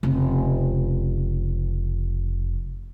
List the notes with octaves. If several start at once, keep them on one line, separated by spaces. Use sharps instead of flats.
F1 C#3